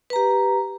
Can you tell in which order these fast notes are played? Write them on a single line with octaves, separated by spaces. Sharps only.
B4 A#5 G4